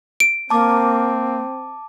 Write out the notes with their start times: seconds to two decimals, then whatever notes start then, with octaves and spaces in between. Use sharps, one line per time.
0.20 D7
0.50 A#3 C4 A5 D6